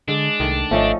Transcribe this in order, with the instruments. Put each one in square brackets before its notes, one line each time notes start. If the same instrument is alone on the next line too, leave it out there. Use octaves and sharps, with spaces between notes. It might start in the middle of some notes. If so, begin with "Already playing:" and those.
[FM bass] D3 [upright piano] G#3 [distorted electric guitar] D4
[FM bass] C2 [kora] D#3 A3
[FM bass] G#1 [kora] F3 C#4 A4 [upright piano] A3 D#5